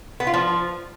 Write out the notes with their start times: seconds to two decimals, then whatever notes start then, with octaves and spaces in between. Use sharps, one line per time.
0.20 B3
0.27 F4
0.34 F3